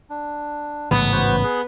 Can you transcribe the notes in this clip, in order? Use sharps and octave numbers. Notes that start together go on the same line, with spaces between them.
D4
A1 G#2 C#3 B3
F#4 B4 C5
G#4 F#6